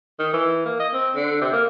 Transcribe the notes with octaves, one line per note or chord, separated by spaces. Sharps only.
D#3
E3
A#3
D#5
C4
D3
C3
A#3